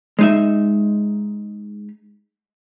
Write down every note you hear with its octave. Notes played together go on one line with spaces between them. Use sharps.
G#3 D#4 E5